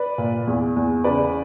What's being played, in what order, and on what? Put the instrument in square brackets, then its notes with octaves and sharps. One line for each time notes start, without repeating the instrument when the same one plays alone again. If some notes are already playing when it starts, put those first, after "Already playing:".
Already playing: [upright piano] B4 D5
A#2
E2
E2
C#3 B4 D5